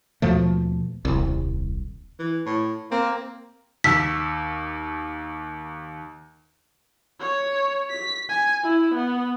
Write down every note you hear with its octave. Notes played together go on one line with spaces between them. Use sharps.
D#2 B2 F3 A3
D#1 C2
E3
A2
A#3 C4
D#2 E6 B6
C#5
B6
G#5
E4
B3